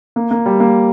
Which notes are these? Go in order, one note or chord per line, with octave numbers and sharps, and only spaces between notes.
A#3
A#3
G3
A#3